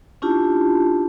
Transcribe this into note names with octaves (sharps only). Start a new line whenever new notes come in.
C#4 D4 E4 F4 G4 A5